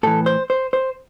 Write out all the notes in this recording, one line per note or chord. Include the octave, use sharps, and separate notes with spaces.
A2 E3 A4
C5
C5
C5